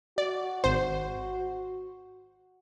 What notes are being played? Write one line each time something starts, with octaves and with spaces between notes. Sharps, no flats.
F#4 D5
G#1 C5